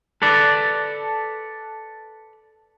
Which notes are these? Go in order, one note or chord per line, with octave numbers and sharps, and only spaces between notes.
A4 B4 D5